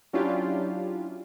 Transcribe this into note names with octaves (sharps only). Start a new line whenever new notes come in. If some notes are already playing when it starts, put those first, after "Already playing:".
F#3 C#4 D4 E4 F4 G4